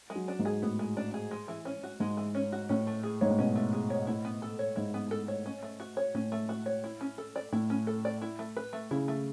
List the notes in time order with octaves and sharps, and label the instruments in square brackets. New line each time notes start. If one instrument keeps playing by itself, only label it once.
[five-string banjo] G#3
[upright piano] F#3
[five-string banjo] D4
[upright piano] G#2
[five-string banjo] G#4
[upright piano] A2 [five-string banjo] B3
[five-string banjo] G#3
D4
G#4
G#3
E3
C#4
F#4
[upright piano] G#2 [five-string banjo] G#3
[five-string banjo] E3
C#4
F#4
[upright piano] A2 [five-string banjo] C#4
[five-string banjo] A3
G#4
[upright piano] G#2 [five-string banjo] C#5
[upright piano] A2
[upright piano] B2 [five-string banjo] C#4
[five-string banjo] A3
G#4
C#5
[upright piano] A2 [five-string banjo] E4
[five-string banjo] B3
A4
C#5
[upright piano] G#2 [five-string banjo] E4
[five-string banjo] B3
A4
C#5
C#4
A3
F#4
C#5
[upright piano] A2 [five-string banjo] C#4
[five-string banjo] A3
F#4
C#5
E4
C#4
A4
D5
[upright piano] A2 [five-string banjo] E4
[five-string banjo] C#4
A4
D5
E4
A3
B4
A3
[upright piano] C#3 [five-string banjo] E4
[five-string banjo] A3